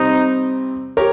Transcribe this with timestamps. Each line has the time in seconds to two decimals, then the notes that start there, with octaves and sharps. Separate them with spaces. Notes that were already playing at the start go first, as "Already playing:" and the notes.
Already playing: C3 G3 C4 D#4
0.97 G4 A#4 C#5